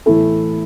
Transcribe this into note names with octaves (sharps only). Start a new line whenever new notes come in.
A2 E3 A3 E4 A4